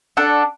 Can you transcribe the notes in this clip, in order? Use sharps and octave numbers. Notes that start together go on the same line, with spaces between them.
D4 A4 F#5